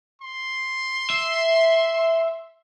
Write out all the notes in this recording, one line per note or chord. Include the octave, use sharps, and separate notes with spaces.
C6
E5